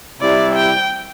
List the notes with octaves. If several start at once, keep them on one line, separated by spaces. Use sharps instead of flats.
C3 G3 C4 E4 D5
G5